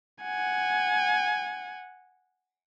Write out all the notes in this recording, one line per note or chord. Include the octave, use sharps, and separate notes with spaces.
F#5 G#5